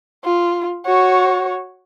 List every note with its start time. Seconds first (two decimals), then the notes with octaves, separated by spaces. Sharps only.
0.24 F4
0.85 F#4 C#5